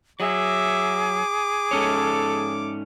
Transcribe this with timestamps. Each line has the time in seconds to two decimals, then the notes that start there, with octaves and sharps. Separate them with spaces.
0.20 F#3 G#4 E5 D6
1.71 G#2 C#4 A4 C#5